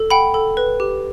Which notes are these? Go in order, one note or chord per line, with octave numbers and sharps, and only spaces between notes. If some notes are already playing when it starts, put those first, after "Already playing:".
Already playing: A4
F#5 G5 B5
A4
B4
G4